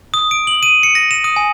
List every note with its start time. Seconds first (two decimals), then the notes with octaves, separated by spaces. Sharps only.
0.14 D#6
0.31 D7
0.47 F#7
0.63 D#7
0.83 C#7
0.95 A#6
1.11 E7
1.24 D#6
1.36 G#5